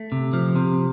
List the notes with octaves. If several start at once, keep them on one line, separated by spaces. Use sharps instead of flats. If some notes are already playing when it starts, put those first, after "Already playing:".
Already playing: A3
C3
F3
C3